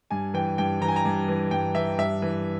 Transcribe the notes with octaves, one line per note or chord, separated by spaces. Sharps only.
G2 G#5
E3 G5
G2 G5
E3 A#5
G#5
A#5
G2
E3
G2 G5
E3 E5
G2 E5
E3